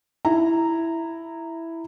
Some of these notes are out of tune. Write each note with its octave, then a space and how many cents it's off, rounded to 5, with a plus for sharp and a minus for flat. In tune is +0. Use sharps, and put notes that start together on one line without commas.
E4 +0 A#5 -10